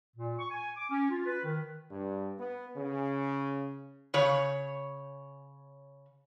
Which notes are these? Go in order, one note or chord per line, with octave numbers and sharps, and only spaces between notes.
A#2
C#6
G#5
D6
C#4
F4
B4
D#3
G2
B3
C#3
C#3 C#5